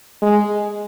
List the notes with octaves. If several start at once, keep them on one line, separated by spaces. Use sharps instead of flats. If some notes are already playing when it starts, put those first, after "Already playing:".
G#3